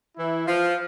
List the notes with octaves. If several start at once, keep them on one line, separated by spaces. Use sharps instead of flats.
E3 E4
F3 F4